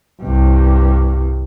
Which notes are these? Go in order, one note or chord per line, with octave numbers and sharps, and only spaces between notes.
C2 G2